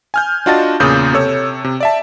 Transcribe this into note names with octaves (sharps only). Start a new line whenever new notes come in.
G#5 F6 G6
D4 F4 F#4 D#5 A5 A6
E2 A#2 C#3 D#6 G6
C3 A4 C#5 E6
C3
D5 E5 A5